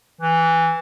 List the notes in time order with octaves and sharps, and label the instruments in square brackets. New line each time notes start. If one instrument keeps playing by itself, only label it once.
[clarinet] E3